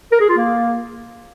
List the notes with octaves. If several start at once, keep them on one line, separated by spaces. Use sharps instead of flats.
A#4
G#4
F4
A#3